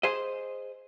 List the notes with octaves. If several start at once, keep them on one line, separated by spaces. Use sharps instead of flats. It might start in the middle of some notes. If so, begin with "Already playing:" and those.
G#4 C5 D#5